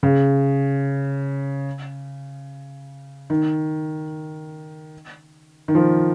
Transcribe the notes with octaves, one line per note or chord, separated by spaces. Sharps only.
C#3
D#3
D#3
F3